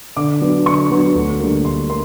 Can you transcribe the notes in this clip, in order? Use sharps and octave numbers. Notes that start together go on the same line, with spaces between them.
D3 D6
F#3 B3 D4
D3 C#6
F#3 B3 D4
D2
D3 G3 A#3
D2 C6
A#3 C6